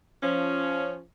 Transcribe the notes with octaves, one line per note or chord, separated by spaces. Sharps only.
F3 C#4